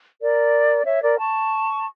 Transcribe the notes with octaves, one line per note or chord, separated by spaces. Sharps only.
A#4 D5
C#5 E5
A#4 D5
A5 C#6